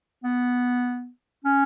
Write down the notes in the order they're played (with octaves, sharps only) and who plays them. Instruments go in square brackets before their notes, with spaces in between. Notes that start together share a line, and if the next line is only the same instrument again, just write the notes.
[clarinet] B3
C#4